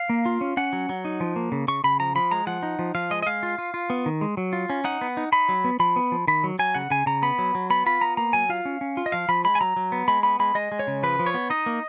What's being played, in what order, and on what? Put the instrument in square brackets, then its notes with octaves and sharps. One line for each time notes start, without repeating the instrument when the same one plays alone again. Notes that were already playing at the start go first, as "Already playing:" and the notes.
Already playing: [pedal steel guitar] F5
A#3
F4
C#4
C#4 F#5
F#3
F#3
D#4
F3
A#3
C#3
C#3 C#6
C#3 B5
F3 A#5
F3 B5
G#3 A#5
F3 F#5
D#4
F3
F3 F5
G#3 D#5
D#5
G#3 F5
F4
F4
F4
B3
D#3
G#3
F#3
F4
C#4
D#4 F#5
B3
D#4
D#4 B5
F#3
B3
F3 B5
B3
F3
D#3 B5
F#3
F#3 G#5
C#3 F#5
C#3 G#5
C#3 A#5
B3 B5
F#3
F#3
B3 B5
F4 B5
B3 A#5
A#3 A#5
F#3 G#5
F4 F5
C#4
C#4
F4
D#5
F3 F5
F3 B5
G#3 B5
G#5
F#3 A#5
F#3
B3
G#3 B5
B3 B5
G#3 B5
G#3 D#5
G#3
C#5
C#3
F3 B4
F3
C#5
B3
D#4 D#5
A#3